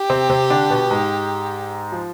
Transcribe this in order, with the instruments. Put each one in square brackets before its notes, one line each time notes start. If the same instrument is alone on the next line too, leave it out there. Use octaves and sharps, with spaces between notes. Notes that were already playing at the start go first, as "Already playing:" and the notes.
Already playing: [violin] G4
[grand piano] C3 C4
C3 C4
D3 D4
B2 B3
G#2 G#3
F3